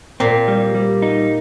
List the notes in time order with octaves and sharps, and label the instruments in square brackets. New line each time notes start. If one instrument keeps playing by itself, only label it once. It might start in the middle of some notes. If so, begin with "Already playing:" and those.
[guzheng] A#2 [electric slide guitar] C4
[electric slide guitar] G3
G3
D#4